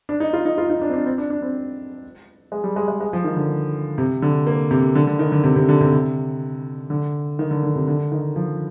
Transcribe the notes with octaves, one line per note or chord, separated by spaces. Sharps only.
D4
D#4
F4
D#4
F4
D#4
D4
C4
D4
C4
D4
D4
C4
G#3
G3
G#3
G#3
G#3
F3
D#3
D3
C3
D3
A#3
C3
D3
D3
D#3
D3
C3
C3
D3
C3
C3
D3
D#3
D3
D3
C3
D3
D#3
F3